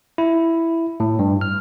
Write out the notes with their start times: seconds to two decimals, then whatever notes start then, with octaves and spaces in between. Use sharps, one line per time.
0.18 E4
1.00 A2
1.19 G2
1.41 F6